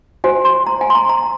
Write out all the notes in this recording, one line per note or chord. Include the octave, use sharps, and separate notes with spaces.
F#4 C5 G#5
C6
A#5
G#5
C6
A#5
A#5